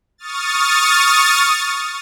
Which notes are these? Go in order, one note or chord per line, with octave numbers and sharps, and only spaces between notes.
C#6 D#6 F6 A6